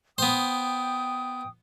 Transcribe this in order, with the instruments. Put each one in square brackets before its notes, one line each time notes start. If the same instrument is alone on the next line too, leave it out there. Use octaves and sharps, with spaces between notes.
[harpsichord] B3 C5 [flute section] G5 D#6